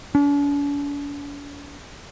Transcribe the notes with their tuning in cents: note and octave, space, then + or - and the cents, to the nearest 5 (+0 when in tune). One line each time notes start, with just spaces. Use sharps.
D4 -45